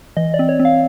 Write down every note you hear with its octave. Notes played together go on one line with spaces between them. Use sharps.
E3 D#5
D5
C4
C#5
C4
F5